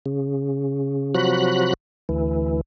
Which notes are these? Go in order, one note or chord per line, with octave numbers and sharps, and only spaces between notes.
C#3
C3 F3 F#3 F#4 B5 F#6
D2 E3